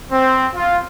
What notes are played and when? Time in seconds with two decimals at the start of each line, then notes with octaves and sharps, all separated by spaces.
0.11 C4
0.56 F4